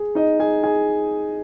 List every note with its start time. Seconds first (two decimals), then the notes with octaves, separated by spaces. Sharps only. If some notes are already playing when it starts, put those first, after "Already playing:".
Already playing: G#4
0.15 D#4 D#5
0.40 G#4 G#5
0.63 G#4 G#5